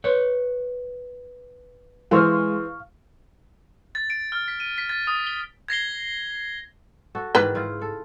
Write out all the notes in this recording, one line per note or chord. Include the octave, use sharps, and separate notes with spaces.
B4 C#5
E3 G#3 C5 F5 C#6 F6
A6
D7
F6
B6
D#7
B6
A6
D#6
G7
G#6 A#6 C7 G7
F#4 A4
G#2 D#3 E3 B4
C#3 E4 F4
A4